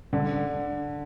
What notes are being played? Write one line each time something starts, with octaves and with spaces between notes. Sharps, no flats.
D3